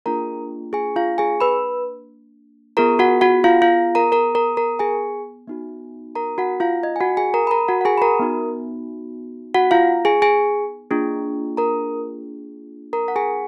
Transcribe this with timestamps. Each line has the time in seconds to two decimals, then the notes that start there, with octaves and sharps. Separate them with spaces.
0.06 A#3 D4 F4 G#4 A#4 A#5
0.73 G#4 G#5
0.96 F4 F5
1.18 G#4 G#5
1.40 B4 B5
2.77 B3 F4 G#4 A#4 A#5
2.99 F#4 F#5
3.21 F#4 F#5
3.44 F4 F5
3.62 F4 F5
3.95 A#4 A#5
4.12 A#4 A#5
4.35 A#4 A#5
4.57 A#4 A#5
4.79 G#4 G#5
5.48 B3 D#4 F#4
6.15 A#4 A#5
6.38 F#4 F#5
6.60 F4 F5
6.83 D#5
6.96 G#5
7.01 F#4 F#5
7.17 G#4 G#5
7.34 A#4 A#5
7.47 B5
7.51 A#4 A#5
7.68 F#4 F#5
7.81 F#5
7.85 G#4 G#5
7.98 B5
8.02 A#4 A#5
8.19 B3 D#4 F#4
9.54 F#4 F#5
9.71 F4 F5
10.05 G#4 G#5
10.22 G#4 G#5
10.91 A#3 D4 F4 G#4
11.57 A#4 A#5
12.93 A#4 A#5
13.08 F#5
13.16 G#4 G#5